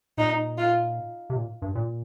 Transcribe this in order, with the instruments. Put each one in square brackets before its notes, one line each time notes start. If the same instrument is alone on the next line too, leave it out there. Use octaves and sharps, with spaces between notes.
[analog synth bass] A#2 [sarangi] D#4
[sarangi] F4
[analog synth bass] C3
A#2
G2
A#2